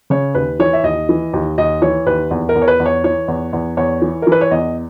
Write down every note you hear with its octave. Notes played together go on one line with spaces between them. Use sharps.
C#3 C#5
D#2 B4
E3 C#5
E5
D#2 D#5
E3
D#2
D#2 D#5
E3 C#5
D#2 B4
E2
A#4
E2
C#5
B4
E2
C#5
E3 C#5
E2
E2
E2 C#5
E3
A#4
E3
B4
C#5
E2 D#5